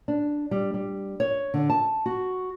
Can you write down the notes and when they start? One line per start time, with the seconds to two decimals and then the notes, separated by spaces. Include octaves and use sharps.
0.08 D4
0.51 G3
0.74 G3
1.20 C#5
1.54 D3
1.70 A5
2.06 F#4